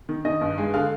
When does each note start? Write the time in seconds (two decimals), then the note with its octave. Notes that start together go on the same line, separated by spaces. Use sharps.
0.09 D#3
0.25 D#3 D#5
0.41 G2
0.58 G#3
0.74 D3 F5